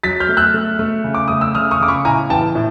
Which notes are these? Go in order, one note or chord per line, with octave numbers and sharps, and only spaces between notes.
F#3 A6 B6
F6 G6
A3
E6 F#6
A3
A3
C#3
D6
A3 D#6
E6
C#3 D#6 F6
C#6 D#6
C#3 D6
B5 C#6
A2 G#5 A#5
E3 G5 A5
A2